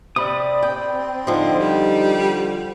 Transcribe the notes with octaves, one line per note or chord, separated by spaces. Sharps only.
C3 C4 D5 B5 D#6
G5
D3 F3 D#4
G3